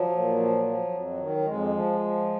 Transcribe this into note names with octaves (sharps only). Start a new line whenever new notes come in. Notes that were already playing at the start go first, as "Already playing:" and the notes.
Already playing: F3 F#3
A#2
F3
F3
F2
D#3
F#3
F2 G#3
F3
F3